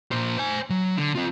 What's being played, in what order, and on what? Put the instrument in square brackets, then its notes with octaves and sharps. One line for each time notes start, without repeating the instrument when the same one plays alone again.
[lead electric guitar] A#2 C5
C5 G#5
F#3
D3
C4 F4